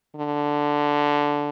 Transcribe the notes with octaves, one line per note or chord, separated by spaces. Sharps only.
D3